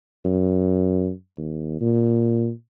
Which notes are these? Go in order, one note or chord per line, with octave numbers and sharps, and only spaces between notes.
F#2
D#2
A#2